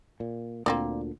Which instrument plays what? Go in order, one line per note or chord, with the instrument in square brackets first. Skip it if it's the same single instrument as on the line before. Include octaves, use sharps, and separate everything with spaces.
[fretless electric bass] A#2
[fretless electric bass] D2 A#2 D3 [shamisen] A#3 C4 D5